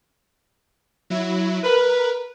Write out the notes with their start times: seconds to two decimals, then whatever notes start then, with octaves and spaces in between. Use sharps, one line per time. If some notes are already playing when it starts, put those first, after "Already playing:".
1.10 F#3 E4
1.64 A#4 B4